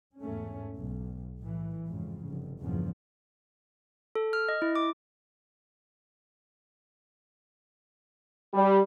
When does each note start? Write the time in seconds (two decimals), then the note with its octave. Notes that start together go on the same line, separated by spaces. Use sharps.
0.20 E2 G#2 A3 C#4
0.77 B1
1.39 A2 E3
1.87 F2 G#2 C#3
2.26 F1 G2
2.59 E2 G2 A#2 C#3 F3
4.15 A4
4.33 F6
4.49 D#5
4.62 E4
4.76 D6
8.54 G3